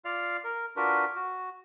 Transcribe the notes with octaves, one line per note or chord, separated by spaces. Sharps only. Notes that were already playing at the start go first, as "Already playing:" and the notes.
F4 D5 F5 F6
A#4
D4 F4 F#4 A#4 B4
F#4